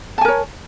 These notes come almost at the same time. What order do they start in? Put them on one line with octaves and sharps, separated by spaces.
A5 G#5 A#4 C#5